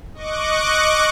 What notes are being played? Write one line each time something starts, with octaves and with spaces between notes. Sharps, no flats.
D#5 C#6 D6 F#6